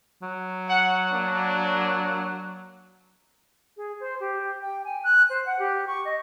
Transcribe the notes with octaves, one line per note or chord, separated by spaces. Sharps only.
F#3
F#5
A#3 D4
G#4
C5
G4
G5
G#5
F#6
C5
F#5
G4
C#6
D#5